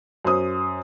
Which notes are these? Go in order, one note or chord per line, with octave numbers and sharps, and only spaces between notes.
F#2 C5 D#6